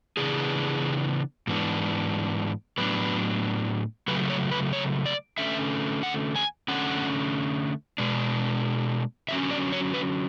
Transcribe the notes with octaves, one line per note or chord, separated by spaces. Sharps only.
C#3 E3 B3 D4 G#4
G#2 E3 B3 D4
A2 F#3 B3 D4 B4
C#3 F#3 A3 B4
C#5
B4
C#5
D5
D3 A3 C#4 E5
F#5
G#5
D3 A3 C#4 F#5
B2 G#3 D4
D3 F#3 C#4 E5
D5
C#5
B4